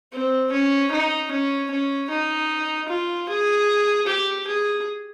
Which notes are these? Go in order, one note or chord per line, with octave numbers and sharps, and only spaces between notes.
C4
C#4
D#4
C#4
C#4
D#4
F4
G#4
G4
G#4